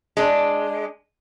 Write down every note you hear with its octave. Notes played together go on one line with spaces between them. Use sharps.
G#3 D4